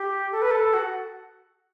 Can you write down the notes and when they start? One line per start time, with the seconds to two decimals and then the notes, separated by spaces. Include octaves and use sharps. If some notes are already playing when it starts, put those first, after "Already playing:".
Already playing: G4
0.32 A4
0.42 B4
0.51 A4
0.74 F#4